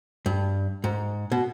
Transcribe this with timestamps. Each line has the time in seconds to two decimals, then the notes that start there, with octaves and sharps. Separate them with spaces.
0.26 G2
0.84 G#2
1.32 B2